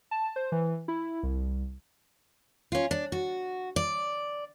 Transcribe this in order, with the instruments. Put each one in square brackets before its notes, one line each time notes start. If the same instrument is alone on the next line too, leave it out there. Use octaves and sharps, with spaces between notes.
[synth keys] A5
C5
E3
E4
C2
[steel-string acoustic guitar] C#4 F4
D4
F#4
D5